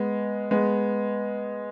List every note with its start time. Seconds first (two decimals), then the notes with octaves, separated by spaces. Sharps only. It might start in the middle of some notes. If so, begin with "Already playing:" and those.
Already playing: G#3 B3
0.51 G#3 B3